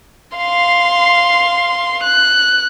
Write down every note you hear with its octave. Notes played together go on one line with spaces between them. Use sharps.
F5 C6
F#6